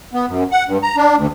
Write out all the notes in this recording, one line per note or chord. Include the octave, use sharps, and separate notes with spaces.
B3
F#2
F#5
G2
A#5
D4
D2